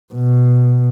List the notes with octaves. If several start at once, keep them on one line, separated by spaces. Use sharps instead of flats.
B2